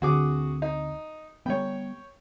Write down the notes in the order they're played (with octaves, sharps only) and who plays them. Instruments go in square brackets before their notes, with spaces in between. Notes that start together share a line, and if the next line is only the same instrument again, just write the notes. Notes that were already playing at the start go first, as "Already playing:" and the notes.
[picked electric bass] D2 D3 C4 [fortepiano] F#4 G#4 D6
[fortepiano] D#4
[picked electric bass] G3 A3 B3 [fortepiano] C#5 G5